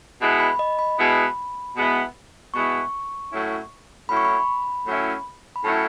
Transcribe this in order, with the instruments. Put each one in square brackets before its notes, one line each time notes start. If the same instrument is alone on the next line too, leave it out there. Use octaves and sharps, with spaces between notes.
[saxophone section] B2 G#3 B3 E4
[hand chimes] B5
D#5
B5
[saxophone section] B2 G#3 B3 E4
B2 G#3 B3 E4
[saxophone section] B2 G#3 B3 E4 [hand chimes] C#6
[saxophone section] A2 F#3 C#4 E4
[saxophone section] A2 F#3 C#4 E4 [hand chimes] B5
[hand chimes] C#6
B5
[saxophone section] A2 F#3 C#4 E4
[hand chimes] B5
[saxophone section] A2 F#3 C#4 E4 [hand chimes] A5